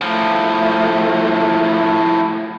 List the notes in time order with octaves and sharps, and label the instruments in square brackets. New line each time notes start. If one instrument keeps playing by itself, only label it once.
[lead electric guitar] A2 F3 [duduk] A3